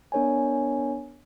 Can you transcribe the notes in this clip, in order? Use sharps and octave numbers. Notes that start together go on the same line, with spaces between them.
B3 D4 A#4 C#5 D#5 G#5